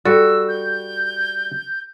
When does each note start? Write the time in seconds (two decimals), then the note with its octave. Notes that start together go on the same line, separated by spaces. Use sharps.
0.06 G3 F#4 A4 E6
0.48 G6